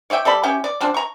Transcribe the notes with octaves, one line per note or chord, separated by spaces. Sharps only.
C#5 D5 E5 G5
G3 A4 D5 B5
C#4 E4 G4 G5
D5
F3 C4 D4
A#5 C#6